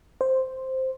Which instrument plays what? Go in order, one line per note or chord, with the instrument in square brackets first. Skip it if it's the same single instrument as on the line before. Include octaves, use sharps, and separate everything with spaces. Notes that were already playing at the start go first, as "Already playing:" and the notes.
[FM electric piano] C5